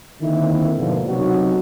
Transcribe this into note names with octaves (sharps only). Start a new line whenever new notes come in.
D3 D#3 A#3 C4 E4
G#2 B2 D3 F3 A#3 B3
B1 C3 F#3 D#4 F#4